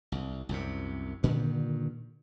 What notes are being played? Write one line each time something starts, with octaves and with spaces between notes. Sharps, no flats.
C2
C2 F#2 C3
G2 A#2 D3 D#3